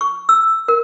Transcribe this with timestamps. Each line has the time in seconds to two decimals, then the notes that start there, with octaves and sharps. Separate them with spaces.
0.01 C#6
0.29 E6
0.68 A#4